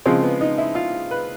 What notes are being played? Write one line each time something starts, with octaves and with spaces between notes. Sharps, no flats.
C#3 F3 G#3 C4
B3
D#4
E4
F4
B4